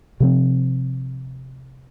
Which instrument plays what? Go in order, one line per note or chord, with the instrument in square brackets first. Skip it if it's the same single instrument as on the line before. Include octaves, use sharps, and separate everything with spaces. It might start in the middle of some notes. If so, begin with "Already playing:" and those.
[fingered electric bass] C3 F3 C4